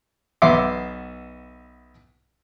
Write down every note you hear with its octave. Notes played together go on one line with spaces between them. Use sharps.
B1 B3 E5 C6 D6